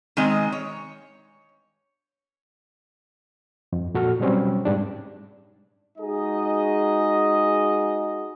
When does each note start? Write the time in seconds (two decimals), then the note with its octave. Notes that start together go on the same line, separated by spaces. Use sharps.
0.17 D#3 G#3 C4 D#5
0.52 C#5
3.73 F2
3.95 A#2 F#4 A4 F6
4.20 B2 F#3 G3 C4 C#4
4.65 G#2 G3 D4
5.98 G#3 D#4 F#4 G#4 D#5